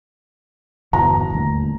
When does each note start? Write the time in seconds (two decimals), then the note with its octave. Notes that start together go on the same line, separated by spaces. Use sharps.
0.93 G1 E2 B2 A#5
1.30 D#1 D2